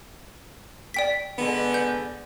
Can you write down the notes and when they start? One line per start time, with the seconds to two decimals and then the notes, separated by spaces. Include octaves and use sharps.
0.94 D5 G5 B6
1.38 D3 G#3 B3
1.74 G6